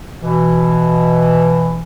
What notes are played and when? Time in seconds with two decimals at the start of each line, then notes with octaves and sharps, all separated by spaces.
0.23 B2 E3